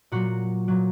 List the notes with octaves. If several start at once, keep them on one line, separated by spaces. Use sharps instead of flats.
A#2 F#3 F#4
A#2 F#3